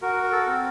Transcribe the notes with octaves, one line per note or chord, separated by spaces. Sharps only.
F#4 A#4
A#4
A4
C4